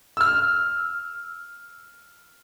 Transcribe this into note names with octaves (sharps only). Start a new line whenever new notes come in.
E6 F6